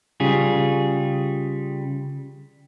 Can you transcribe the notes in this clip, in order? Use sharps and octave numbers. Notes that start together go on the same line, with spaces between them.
C#3 G3 F4 G#4